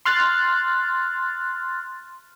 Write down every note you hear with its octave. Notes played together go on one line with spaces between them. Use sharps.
C6 F6 F#6 A6